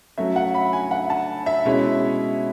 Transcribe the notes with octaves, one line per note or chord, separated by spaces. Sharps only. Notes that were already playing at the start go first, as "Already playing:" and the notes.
F#3 A3 C#4 E5
F#5
B5
G#5
F#5
A5
E5
B2 G#3 C#4 E4